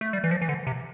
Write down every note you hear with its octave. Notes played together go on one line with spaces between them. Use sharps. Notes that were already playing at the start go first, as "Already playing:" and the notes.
A3
G3
E3
F3
E3
D3
C3